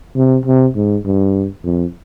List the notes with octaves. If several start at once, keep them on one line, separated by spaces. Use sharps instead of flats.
C3
C3
G#2
G2
F2